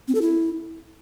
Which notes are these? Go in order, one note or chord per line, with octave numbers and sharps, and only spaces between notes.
C4
A4
E4